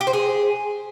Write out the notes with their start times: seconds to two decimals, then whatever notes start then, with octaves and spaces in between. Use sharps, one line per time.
0.01 G4
0.07 C5
0.13 G#4